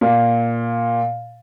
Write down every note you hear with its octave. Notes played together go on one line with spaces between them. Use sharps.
A#2